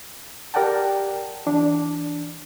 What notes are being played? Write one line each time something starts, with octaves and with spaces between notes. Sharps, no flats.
G4 A#4 D5 F#5 G5 A5
E3 D4